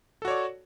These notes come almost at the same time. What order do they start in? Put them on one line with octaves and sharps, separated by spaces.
A4 F#4 C#5 D5